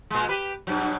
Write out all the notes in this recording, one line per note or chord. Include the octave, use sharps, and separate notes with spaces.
A#2 G#3
G4 B4
G2 B2 F#3